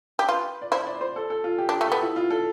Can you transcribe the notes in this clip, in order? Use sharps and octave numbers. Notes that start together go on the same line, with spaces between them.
G4
F4 B4
D5
E4 C5
D5
C5
A4
A4
F4
G4
D4
G4
A3
B3 A4
E4
F4
A4